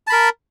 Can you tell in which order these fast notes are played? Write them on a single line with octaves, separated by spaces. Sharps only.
A5 B5 A#4